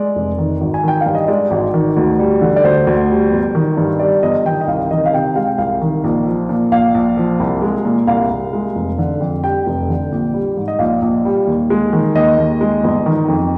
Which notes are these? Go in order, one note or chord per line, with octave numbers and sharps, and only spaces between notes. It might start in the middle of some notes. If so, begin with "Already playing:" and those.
Already playing: G#3 D5
F1
D#3
G#1
G#5
D#3 G5
F5
G2
D#5
G#3 D5
G#1
D#3
D2
G3
D3
D5
D2 C5
D2
G3
G1
D#3
G2
G3 D5
G1 D#5
D#3 G5
D#5
C2 F5
D#3 D#5
F5
C3 G5
G#3 F5
G5
C2 F5
D#3
A#1
F3
A#2
A#1 F5
A#1
F3
C2
G#3
A#2
C2 F5
C2
G#3
F1
D3
F2
G3 G5
F1
D3
A#1
G3
G#2
D#5
A#1 F5
A#1
G3
D#2
G#3
D#3
D#2 D#5
D#2
G#3
G1
D#3
F2